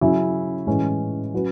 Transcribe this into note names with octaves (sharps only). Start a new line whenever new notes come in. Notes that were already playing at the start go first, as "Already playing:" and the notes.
C#3 F#3 C#4 E4
A2 E3 G#3 C#4
F#3 C#4 F#4 B4